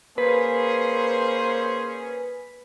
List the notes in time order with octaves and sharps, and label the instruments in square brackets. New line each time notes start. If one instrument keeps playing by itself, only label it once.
[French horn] A#3 [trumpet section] C#4 G#4 [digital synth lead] B4 [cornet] C5